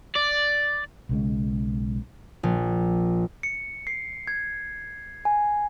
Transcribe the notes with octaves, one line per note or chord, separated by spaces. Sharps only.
D5
B1 C#3 G#3
A#1
C#7
C7
G#6
G#5